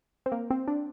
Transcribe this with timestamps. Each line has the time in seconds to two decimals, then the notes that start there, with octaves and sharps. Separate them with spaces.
0.26 C4
0.32 A#3
0.51 C4
0.68 D4